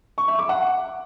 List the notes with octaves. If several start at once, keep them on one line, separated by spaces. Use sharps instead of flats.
C#6
E5
D6
F#5